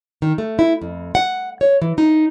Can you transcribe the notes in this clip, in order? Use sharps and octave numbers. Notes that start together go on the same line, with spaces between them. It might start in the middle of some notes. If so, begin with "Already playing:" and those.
D#3
A3
E4
F2
F#5
C#5
E3
D#4